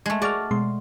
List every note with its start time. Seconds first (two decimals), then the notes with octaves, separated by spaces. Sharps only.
0.06 G#3 A3
0.22 F#4 G#4 D5 A5 F6
0.51 B2 G#3 C6